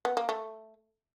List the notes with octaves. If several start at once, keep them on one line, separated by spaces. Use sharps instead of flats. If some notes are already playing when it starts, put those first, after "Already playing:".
B3
A#3
A3